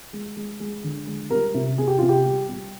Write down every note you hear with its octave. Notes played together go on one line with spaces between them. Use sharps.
G#3
G#3
G#3
D3
G#3
G3 A#4
C3
C3 G#4
G4
C3 F4
G4
G3
G3